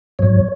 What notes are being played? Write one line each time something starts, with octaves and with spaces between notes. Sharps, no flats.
G#2 F#3 C#5